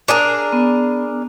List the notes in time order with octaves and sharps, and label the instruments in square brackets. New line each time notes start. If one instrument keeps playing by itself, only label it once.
[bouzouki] D4 G#4 A#4
[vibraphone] B3